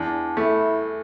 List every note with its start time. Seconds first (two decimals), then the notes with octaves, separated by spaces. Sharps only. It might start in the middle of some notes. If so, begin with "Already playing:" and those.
Already playing: E2 D4
0.37 A3 E4